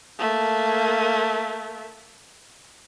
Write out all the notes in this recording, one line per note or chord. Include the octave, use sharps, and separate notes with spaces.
A3 A#3